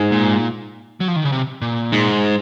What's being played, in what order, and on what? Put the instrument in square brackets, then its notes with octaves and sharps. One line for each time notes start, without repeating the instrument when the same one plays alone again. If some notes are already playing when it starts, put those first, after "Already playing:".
Already playing: [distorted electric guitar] G#2
[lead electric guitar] A#2
F#3
F3
D#3
C#3
C3
A#2
[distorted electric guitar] G#2